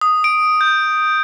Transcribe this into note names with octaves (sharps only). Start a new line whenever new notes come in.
D#6
D7
G6